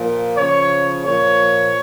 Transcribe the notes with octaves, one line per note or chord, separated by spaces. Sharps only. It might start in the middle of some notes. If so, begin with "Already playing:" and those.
Already playing: A#2 F3
C#3 F3 C#5
A#2 F3 C#5